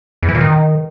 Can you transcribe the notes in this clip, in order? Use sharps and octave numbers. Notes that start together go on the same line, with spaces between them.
E2
E3
A#2
D#3